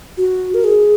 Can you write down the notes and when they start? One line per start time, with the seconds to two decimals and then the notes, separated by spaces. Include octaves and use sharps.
0.17 F#4
0.54 A#4
0.64 G#4